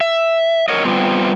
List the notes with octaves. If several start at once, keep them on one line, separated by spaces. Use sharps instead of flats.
E5
A#4 C#5 D#5
G3 B3 C4 F4